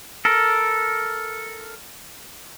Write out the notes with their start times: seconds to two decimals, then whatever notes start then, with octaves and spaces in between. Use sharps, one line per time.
0.25 A4 A#4